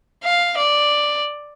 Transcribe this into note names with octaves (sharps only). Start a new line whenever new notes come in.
F5
D5